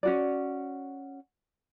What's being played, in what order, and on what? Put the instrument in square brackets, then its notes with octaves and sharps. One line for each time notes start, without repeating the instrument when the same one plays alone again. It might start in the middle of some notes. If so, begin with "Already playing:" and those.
[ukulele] C#4 F#4 D5